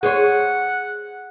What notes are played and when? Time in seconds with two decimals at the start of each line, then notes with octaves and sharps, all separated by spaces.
0.03 G#4 C5 C#5 F#5